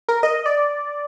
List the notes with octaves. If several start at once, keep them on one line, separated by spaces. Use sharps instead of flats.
A#4
D#5
D5